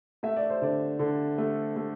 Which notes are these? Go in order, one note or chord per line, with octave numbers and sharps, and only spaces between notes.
A3 E5
D5
C5
D3 D5
D3
A3
A3